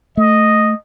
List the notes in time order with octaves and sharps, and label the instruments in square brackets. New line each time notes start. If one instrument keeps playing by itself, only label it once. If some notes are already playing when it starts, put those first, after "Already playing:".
[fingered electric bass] A3 [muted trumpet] D#5